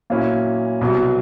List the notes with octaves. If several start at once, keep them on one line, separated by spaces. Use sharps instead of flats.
A#2 F#3 A#3 C#4 E4
C2 B2 F#3